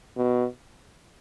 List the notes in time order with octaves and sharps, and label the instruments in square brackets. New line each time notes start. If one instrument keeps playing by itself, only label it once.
[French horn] B2